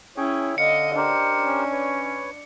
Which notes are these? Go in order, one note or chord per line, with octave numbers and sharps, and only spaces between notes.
C#4 E4 G#4 C#5 G5
D3 D#5 F5 C#7
D4 G4 A#4 C5
C#4
B4 C#5